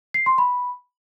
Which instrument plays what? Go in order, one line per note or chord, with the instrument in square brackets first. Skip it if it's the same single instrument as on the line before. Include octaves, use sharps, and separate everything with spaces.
[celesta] C7
C6
B5